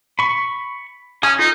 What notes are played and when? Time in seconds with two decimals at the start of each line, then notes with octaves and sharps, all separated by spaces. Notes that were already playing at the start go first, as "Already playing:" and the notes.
0.19 B5 C#6
1.23 C#4 G#5 D#6
1.39 D#4 F4 A4